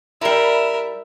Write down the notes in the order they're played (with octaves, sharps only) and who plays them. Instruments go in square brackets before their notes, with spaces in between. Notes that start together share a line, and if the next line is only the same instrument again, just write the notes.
[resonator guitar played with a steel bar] G3 E4 [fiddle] A#4 E5